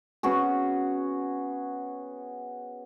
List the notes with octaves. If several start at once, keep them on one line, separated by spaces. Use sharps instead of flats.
B3 C#4 F#4 G#4